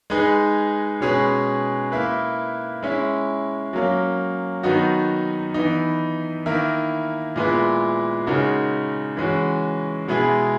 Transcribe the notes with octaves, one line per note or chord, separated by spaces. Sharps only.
G#3 D#4 G#4 B4
B2 G#3 C#4 G#4 B4
A#3 E4 B4
G#3 C#4 E4
F#3 A#3 C#4
D#3 F#3 B3 D#4 F#4
E3 B3 D#4
D#3 A#3 E4 A#4
A#2 G#3 B3 E4 B4
C#3 G#3 D#4 F#4 A#4
E3 G#3 C#4 F#4
B2 G#3 B3 E4 G#4